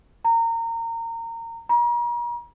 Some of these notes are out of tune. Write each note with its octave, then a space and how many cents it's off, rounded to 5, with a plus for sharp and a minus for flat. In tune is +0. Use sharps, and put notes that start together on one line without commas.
A#5 -25
A#5 +40